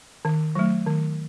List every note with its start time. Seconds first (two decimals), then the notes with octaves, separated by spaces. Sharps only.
0.25 D#3
0.55 F#3 A3
0.86 D#3